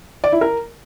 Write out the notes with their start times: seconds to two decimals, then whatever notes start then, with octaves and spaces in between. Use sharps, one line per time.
0.24 D5
0.32 E4
0.41 A#4